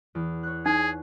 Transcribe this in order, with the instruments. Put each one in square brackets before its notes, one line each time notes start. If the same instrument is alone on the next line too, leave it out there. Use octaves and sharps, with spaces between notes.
[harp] E2
C#5 F#6
[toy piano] D#4 [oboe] G#4